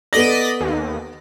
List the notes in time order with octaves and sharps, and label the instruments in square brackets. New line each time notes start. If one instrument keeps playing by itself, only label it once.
[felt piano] B3 A4 A#6 [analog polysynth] D5 D#5 B6
[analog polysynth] D#2